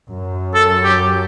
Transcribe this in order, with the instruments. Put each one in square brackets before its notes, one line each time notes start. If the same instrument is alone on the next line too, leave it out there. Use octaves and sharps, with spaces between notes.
[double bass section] F#2
[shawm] A4
G4